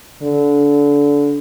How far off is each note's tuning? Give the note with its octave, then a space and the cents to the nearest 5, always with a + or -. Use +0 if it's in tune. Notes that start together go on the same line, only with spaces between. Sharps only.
D3 -25